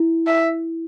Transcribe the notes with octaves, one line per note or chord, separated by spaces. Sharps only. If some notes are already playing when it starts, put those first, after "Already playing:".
Already playing: E4
E5